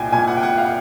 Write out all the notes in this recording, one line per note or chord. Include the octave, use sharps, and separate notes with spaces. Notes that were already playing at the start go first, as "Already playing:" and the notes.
Already playing: C2 A#2 G5 G#5
C2 A#2 G#5
F#5
G5
F#5
F5